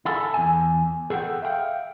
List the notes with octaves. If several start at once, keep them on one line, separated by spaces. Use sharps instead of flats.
E4 G#4 A4
E2 G#5
G#4 A4 F#5 G5
E5 F5 G5